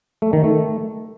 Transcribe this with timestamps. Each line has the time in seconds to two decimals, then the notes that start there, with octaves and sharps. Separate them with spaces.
0.22 A3
0.33 D#3
0.44 A3